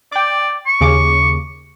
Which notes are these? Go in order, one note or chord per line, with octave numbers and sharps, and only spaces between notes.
D5 G5 D6
C#6
D#2 C#3 D6